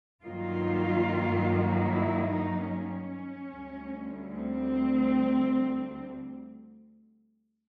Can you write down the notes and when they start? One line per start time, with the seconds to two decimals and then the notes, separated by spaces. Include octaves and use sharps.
0.24 G2 D#3 F#3 A#3 F4
1.87 E4
2.29 D#4
2.69 C#4
3.52 D2 D3 G3
4.33 C4